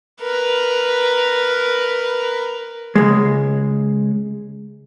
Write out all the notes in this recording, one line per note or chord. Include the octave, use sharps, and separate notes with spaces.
A#4 B4
C#2 G#3